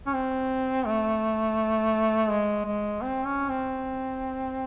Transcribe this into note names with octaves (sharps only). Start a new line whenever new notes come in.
C#4
C4
A3
G#3
G#3
C4
C#4
C4